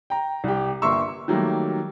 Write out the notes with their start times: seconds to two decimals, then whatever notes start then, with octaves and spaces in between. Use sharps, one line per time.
0.10 G5 A#5
0.44 C2 G4
0.82 G1 A#3 E5 C6 C#6 E6
1.02 C#6
1.28 D#3 F#3 G3 A3 A#3